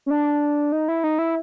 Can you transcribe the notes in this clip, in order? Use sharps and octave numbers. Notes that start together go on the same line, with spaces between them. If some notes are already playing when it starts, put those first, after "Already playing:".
C#4
D4
D#4
E4
D#4
E4